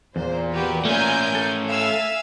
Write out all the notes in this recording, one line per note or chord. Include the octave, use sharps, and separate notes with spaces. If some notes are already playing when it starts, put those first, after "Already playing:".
E2 A#2 C5
F#4 G4 B4
A3 A#3 C#4 A#4 G#5 G6
A4
E5 F5 G#5 E6